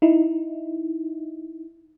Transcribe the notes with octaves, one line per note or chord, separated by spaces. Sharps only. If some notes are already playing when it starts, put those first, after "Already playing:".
D#4 E4